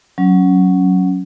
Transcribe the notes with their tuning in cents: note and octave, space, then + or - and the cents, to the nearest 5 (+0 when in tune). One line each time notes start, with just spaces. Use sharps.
F#3 +0 C#4 +0